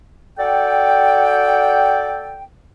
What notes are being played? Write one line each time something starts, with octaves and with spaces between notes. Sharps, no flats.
F#4 A4 D5 G5